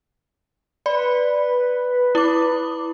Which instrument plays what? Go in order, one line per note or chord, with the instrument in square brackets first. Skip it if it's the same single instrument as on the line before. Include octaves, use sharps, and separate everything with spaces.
[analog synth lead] B4 [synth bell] D5
[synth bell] E4 D6